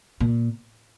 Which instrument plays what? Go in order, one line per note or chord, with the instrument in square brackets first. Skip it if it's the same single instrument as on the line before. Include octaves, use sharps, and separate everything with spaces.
[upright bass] A#2